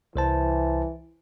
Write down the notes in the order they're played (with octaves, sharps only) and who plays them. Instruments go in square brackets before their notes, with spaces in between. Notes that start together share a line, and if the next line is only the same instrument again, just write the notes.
[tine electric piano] C2 C5 A5 [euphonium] E3